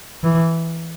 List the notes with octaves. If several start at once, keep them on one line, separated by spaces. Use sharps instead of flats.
E3